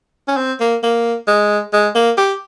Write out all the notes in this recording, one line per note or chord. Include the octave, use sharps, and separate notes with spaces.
C#4
C4
A#3
A#3
G#3
G#3
A#3
G4